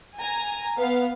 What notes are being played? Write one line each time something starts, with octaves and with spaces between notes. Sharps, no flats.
G#5 A#5
B3 F5